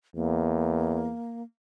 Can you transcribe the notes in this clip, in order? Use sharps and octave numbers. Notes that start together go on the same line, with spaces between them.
E2 A#3